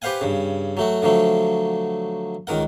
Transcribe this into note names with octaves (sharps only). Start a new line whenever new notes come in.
G4 B4 C5 F5 F#5 G#5
G2 C#3
F#3 A3 F#4
D3 F3 F#3 A3
C#2 D#3 A#4 F#5